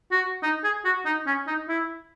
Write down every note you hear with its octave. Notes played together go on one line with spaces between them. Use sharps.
F#4
D#4
G#4
F#4
D#4
C#4
D#4
E4